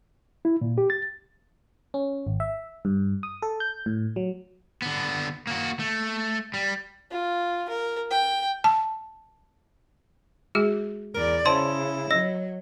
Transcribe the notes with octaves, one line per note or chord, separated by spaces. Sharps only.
E4
A#2
G4
A6
C#4
G#1
E5
G2
D#6
A4
G6
A2
F#3
D3 B3
A#3 F#4
A3
G3
F4
A#4
G5
A5
G#3 F#4 G#4
E2 A#4 D5
C#3 E4 C5 A5 C6
F#3 D#5 E6 A#6